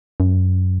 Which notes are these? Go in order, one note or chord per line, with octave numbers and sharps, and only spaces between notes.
F#2